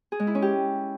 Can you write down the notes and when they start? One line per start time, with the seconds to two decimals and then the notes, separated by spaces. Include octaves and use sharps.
0.12 G#4
0.20 G#3
0.27 E4
0.35 C#4
0.42 G4